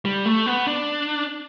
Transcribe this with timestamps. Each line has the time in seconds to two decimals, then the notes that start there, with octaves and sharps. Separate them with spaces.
0.05 G3
0.26 A3
0.46 B3
0.67 D4